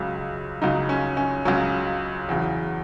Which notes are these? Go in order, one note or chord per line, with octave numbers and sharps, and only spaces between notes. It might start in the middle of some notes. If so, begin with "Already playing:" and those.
Already playing: C#2 C#3 F#3
C#2 C#3 F#3 D#4
C#4
C#4
C#2 C#3 F#3 C#4
E2 C#3 F#3